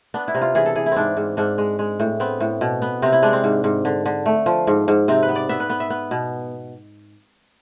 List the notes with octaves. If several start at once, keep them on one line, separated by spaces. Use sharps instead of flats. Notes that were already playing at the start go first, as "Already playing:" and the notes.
B3 D4
E4
C3
F4
E3 G#4
A4
E3 G#4
E4
G#2 C4 D4
G#2
G#2 D4
G#3
G#3
A2
B3 C4
A2
B2
B3
C3 C4
E4
G#3 D4
C4
G#2
G#2
D3
D3
A3
F3
G#2
G#2
C3 C4
B4
B3
D5
B3 E5
B4
B3
E5
B3
B2